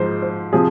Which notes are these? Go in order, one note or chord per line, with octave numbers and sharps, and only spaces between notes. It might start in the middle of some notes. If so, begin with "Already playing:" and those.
Already playing: G#2 F3 G#3 C5
C5
C3 F3 G#4